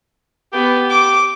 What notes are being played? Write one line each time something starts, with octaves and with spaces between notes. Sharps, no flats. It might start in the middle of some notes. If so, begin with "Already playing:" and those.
B3 G4
D6